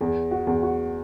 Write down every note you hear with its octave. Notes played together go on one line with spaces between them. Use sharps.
E2
F#4
E2
F#4